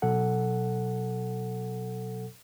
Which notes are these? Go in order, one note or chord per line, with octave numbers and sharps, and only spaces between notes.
B2 F#3 A4 F#5